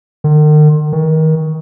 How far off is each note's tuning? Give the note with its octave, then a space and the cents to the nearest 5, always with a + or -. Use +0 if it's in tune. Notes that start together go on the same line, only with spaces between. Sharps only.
D#3 -45
D#3 +30